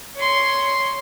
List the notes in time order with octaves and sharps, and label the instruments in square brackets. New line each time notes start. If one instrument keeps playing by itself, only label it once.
[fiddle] C#5 C6